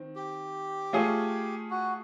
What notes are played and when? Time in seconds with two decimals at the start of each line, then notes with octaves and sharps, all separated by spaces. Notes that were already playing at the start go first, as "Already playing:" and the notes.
Already playing: D#3 C4
0.16 G4
0.93 A3 C#4 F4 G#4
1.70 F#4